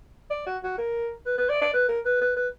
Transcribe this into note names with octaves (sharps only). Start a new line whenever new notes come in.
D5
F#4
F#4
A#4
B4
B4
D5
D5
B4
A#4
B4
B4
B4